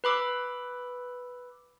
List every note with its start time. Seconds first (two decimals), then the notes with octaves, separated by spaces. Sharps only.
0.04 B4 B5 D6 E6